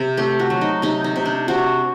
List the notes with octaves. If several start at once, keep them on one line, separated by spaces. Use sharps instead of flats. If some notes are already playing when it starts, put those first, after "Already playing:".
Already playing: C3
A3 G4
F#4
F#3
D#4
C3 D#4
D#4
C3
D4
C3 F#4